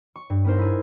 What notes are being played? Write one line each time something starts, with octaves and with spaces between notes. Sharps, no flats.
C#6
G2
B3 D#4 A#4 C5
E4 G#4